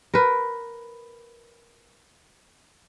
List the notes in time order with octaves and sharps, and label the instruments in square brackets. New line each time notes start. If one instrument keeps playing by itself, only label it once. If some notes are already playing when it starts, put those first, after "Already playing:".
[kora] A#4 B4